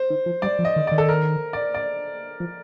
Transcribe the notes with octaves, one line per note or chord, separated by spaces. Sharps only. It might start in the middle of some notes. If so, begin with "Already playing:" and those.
Already playing: C5
D#3
F3
G3 D5
F3
D#5
D#3
D#3 D5
A4
A#4
D5
D5
F3